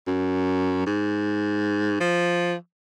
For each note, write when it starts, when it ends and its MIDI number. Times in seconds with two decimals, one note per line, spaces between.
0.07 0.83 42
0.86 1.95 44
2.00 2.54 53